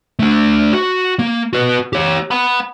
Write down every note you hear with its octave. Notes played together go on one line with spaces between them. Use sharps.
A3 D4
F#4
A#3
F#4 B4
G4 C#5
F#5 B5